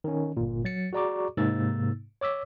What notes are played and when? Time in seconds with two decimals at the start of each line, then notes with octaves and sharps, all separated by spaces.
0.04 D#3 C#4
0.37 G1 A#2
0.65 F#3 A6 C#7
0.93 F#4 G#4 D5 A#5 C#6 D6
1.37 G#2 C3 A#3 D#4 E6 A6
2.21 C#5 D6 E6 B6